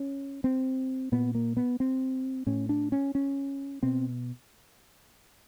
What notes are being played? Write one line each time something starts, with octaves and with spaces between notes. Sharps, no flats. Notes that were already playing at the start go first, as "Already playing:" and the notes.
Already playing: C#4
C4
A#2 B3
A#3
B3
C4
A2 C#4
D4
C#4
C#4
B2 C4